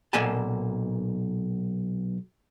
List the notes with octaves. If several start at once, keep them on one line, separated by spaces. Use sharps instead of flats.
B1 A#2 A#3 G#5 A5